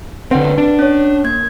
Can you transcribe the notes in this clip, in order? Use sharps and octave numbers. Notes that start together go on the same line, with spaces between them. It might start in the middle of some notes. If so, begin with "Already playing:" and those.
D3 C4 B4 F#5
D4
C#4 C#5
A#3 G#6